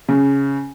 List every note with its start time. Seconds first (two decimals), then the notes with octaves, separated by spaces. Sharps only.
0.09 C#3